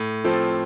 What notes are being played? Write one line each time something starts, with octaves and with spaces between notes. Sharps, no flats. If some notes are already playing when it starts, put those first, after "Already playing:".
Already playing: A2
F3 C4 F4 A4